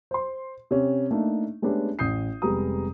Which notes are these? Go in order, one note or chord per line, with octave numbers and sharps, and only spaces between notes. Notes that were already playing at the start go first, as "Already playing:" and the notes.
C5 C6
C3 C#4
A3 A#3 D4 D#4
G#3 A3 B3 C#4 D4 G4
A1 D#6 G6 C7
F1 G3 G#3 B3 A#5 D#6